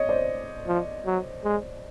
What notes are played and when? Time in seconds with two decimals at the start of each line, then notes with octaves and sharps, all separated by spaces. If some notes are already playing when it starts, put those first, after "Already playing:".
Already playing: C#5 D#5
0.09 C5 D5
0.67 F3
1.06 F#3
1.44 G#3